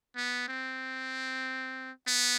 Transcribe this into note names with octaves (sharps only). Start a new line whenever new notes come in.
B3
C4
B3